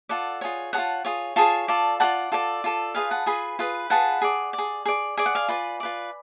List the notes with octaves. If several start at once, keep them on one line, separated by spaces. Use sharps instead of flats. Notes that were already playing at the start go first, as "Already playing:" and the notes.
F4 A4 D5 F#5
F4 G#4 C#5
G#4 C#5 F#5 A5
F4
F4 G#4 C#5
F4 G#4 C#5 A5 C#6
F4 A4 D5
F4 A4 D5 F#5 A5
F4 A4 D5
F4 A4 D5
F4 G#4 B4 F5 G#5
F#5 A5
F4 G#4 B4 G#5 B5
F4 G#4 B4
F4 G#4 B4 F#5 A5
G#4 D5
D5
G#4
G#4 D5
G#4 D5 G#5
F#5
F5 G#5
F4 B4 D5
F4 B4 D5